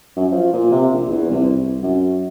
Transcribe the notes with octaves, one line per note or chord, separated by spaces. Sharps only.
F#2
F3
A#2
C3
A#1
E2
C2
C2
F#2